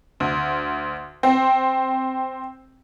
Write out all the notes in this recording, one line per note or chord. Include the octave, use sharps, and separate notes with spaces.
D2
C4